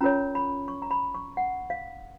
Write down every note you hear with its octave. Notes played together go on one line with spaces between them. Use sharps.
C#4 F4 A#4 C#5 A#5
B5
C#6
A#5
B5
C#6
F#5
F5